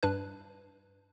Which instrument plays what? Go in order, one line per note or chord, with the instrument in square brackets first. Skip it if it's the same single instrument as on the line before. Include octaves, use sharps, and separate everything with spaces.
[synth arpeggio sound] G2 D4 B4 F#6